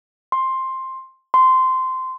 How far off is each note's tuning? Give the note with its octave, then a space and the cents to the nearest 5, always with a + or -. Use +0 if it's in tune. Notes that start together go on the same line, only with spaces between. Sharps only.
C6 +10
C6 -15